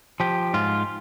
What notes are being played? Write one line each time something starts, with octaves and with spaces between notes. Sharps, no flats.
F3 G4
G#2 F4